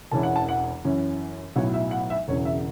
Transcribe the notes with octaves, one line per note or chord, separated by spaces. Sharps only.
E1 E2 E3 C#4 A5
F#5
A5
F#5
F#2 E3 C#4
B1 A2 F#3 B3 C#5
E5
F#5
E5
E1 E2 C#3 C#5
E5